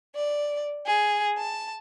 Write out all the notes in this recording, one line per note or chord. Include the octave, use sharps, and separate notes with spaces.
D5
G#4
A5